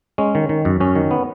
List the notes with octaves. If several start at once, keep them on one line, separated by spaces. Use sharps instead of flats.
G#3 C#4
D#3
D#3
F#2
F#2 C#4
D#3
B3